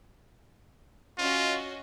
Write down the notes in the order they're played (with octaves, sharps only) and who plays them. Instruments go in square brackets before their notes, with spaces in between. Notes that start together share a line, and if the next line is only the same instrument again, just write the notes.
[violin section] C#4 F#4 D#5 [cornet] F4